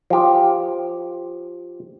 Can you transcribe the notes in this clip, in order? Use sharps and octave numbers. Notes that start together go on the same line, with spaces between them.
F3 G4